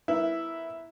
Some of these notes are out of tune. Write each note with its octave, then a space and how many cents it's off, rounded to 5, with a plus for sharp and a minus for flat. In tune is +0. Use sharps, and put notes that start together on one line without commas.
B3 +0 E4 +0 A#4 +0